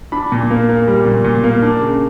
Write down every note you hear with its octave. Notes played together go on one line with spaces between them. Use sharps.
D4 B5
A#2
A#3
A#3
G3
A#2
A#2
A#3
D4
C#3